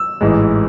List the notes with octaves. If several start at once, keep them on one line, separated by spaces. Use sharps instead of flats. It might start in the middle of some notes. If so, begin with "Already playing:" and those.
Already playing: E6
A1 G#2 E3 G#3